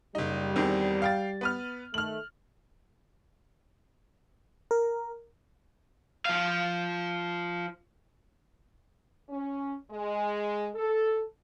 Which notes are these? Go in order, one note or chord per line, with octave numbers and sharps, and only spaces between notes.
F#1 G3 D#4
E2 D#3 C4
F5 G5 A6
B3 B4 F6
D#3 A3 F6 F#7
A#4
F3 F5
C#4
G#3
A4